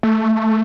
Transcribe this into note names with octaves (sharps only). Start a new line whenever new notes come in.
A3